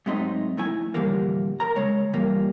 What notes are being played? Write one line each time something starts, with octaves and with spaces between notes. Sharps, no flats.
G#2 F#3 A3 C4 D#4 C6
F2 A3 E4 G#5
A2 D3 E3 F3 G3 A#3
A#4 A#5
C#3 G#3 C#5
G2 A#2 E3 G3 A#3